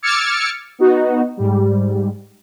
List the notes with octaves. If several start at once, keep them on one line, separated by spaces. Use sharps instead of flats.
D6 E6 F6 G#6 A6 C#7
B3 D#4 F#4
G#2 G3